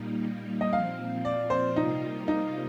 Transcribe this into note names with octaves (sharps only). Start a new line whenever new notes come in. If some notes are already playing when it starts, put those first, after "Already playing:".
Already playing: A#2 G3 A#3 D#4
D#5
A#2 F3 C4 F5
D5
C5
C3 G3 A#3 D#4 F4
D#4